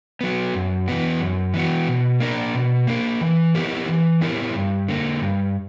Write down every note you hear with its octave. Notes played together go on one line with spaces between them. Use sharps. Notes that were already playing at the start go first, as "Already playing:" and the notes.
F#3 B3
F#2
E3 B3 F#4
F#2
E3 B3 F#4
B2
A#3 D4 A#4
B2
A#3 D4 A#4
E3
B3 E4 G4 A#4
E3
B3 E4 G4 A#4
G2
D3 A#3
G2